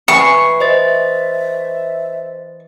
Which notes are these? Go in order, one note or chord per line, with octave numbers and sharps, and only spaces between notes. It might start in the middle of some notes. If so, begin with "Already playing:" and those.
E3 B4 G#5 C#6 C7
C5 D#5 E5 A6